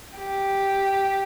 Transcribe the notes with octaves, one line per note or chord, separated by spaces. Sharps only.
G4